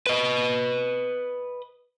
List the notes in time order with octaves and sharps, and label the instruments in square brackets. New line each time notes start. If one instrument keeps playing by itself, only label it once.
[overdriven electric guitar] B4 D#5